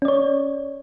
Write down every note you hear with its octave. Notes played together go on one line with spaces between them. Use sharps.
C#4 C#5 D5